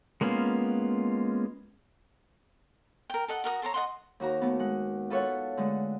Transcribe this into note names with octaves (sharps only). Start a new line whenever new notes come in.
G#3 A#3 B3 C#4 F4
A#4 G5
A4 D#5 F#5
F#4 A#4 D#6
A4 C5 C#5 A#5
D#5 F5 F#5 C6
D#2 F#4 A#5
A3 B3
G#3 F#5
F4 A4 B4 C#5 E5 F#5
D3 G#3 A3